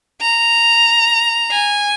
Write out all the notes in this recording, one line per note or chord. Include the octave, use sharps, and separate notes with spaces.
A#5
G#5